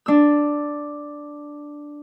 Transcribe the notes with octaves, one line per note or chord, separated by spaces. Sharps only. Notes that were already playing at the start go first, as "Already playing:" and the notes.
D4 E6